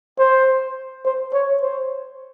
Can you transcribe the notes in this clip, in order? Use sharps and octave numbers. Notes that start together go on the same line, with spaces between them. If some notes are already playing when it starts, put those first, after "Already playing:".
C5
C5
C#5
C5